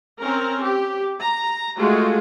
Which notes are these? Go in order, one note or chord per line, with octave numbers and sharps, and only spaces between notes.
C4 C#4 A#4
G4
A#5
G#3 A3 F4 F#4 G#4